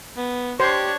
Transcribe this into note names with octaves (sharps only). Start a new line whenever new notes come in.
B3
D4 G4 C5 C#5